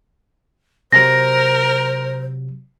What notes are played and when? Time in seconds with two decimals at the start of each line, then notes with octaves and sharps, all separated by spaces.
0.92 C3 F#3 A#4 C5 A#6